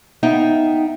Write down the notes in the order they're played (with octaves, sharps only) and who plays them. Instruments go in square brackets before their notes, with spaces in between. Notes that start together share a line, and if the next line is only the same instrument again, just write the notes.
[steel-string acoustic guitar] B3 D#4 E5 F5 G5